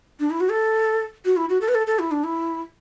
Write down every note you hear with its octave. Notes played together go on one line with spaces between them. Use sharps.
D4
E4
F#4
A4
F#4
E4
F#4
A4
B4
A4
A4
E4
D4
E4